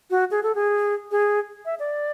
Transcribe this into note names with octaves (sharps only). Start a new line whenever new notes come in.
F#4
G#4
A4
G#4
G#4
E5
D5